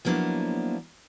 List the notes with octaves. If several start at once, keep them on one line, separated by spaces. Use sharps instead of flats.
F3 F#3 A#3 B3 D4 E4